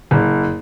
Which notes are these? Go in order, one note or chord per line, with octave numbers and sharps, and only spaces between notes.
F#1